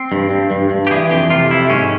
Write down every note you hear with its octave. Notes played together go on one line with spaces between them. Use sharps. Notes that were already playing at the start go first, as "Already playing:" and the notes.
Already playing: C4
G2
G2
G2
G2
G4
E3 G#4
F2 G4
C3 F4
F2 E4
G#2 C#4